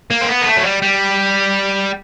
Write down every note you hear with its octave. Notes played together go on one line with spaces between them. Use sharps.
A#3
C4
B3
A#3
A3
F#3
G3
G3